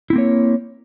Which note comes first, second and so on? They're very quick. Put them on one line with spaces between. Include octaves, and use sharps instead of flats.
E4 C4 A#3 C#5